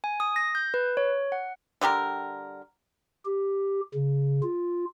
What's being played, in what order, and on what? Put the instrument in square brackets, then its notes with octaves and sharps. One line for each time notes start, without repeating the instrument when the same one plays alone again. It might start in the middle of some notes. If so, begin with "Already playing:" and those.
[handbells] G#5
D#6
A#6
G6
B4
C#5
F#5
[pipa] D3 G3 G4 A#4
[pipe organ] G4
C#3
F4